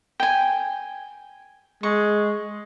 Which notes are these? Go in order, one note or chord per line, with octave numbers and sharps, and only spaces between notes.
G5 G#5
G#3 C#6